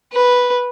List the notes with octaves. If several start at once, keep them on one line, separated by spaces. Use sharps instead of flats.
B4